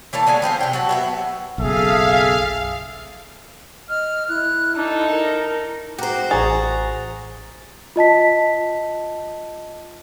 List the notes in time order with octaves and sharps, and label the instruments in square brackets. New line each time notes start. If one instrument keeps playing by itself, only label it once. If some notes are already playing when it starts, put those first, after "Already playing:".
[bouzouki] E3 A#3 C#5 A5
D3 G#3 C#4 G#5
E3 C4 F4 C5
C3 G5
F#3 F#4 A5
F#3 B3 E5
[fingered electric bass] F#1 B1 [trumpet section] G#4 A4 E5 [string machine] F5
[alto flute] D#5 [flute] F6
[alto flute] E4 [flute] F#6
[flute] D4 [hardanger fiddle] D#4 A4
[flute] A#4
[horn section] G#2 G4 [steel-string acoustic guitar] F#4 C5 [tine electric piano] G5 A#5
[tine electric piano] A1 C#6 A6 [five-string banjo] G#4 [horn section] A#5
[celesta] F4 D#5 A5 B6